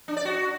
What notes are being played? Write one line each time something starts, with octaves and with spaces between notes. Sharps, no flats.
D4
D5
F#4